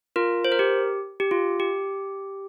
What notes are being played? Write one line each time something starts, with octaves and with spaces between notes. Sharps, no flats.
F4 A#4
C5
A#4
G4
G4
F4
G4